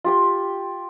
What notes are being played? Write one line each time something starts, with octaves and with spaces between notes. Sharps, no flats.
F4 G4 C6